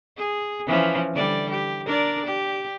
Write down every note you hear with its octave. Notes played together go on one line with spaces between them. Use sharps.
G#4
E3 F3 C#4
D3 G3 D5
G4
D4 A#4 D5
G4